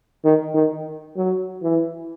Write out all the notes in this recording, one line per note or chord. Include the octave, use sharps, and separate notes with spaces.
D#3
D#3
F#3
E3